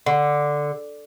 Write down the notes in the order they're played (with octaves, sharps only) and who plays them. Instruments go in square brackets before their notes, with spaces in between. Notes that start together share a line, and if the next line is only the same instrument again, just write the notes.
[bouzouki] D3